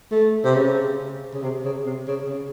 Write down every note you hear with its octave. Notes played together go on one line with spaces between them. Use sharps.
A3
C3
C#3
C#3
C3
C#3
C3
C#3
C#3